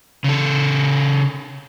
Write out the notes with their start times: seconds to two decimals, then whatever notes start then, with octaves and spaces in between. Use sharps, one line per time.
0.24 C#3 A4